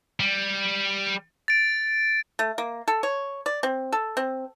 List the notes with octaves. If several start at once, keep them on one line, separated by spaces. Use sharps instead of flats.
G3
A6 D7
A3
A#3
A4
C#5
D5
C4
A4
C4